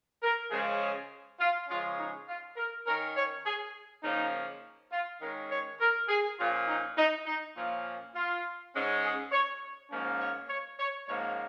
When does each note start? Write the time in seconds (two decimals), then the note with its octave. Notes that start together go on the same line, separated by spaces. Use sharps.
0.23 A#4
0.51 C#3 F3 G#3 C#4 G#4
0.81 G#4
1.40 F4
1.69 C#3 F3 G#3 C#4 F4
1.98 D#4
2.28 F4
2.57 A#4
2.86 D#3 C#4 A#4
3.16 C#5
3.45 G#4
4.03 C#3 F3 A#3 C#4 D#4
4.92 F4
5.21 D#3 G#3 C#4 A#4
5.51 C#5
5.80 A#4
6.09 G#4
6.39 A#2 F3 C#4 F4
6.67 D#4
6.97 D#4
7.26 D#4
7.56 A#2 F3 A#3 C#4 F4
8.15 F4
8.74 G#2 G#3 C#4
9.03 G#4
9.32 C#5
9.91 G#2 F3 A#3 C#4
10.20 C#5
10.49 C#5
10.79 C#5
11.07 G#2 F3 A#3 C#4 C#5